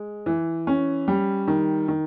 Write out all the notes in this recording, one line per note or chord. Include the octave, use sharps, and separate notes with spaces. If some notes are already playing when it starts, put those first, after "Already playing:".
Already playing: G#3
E3
C#4
G3
D#3
D#3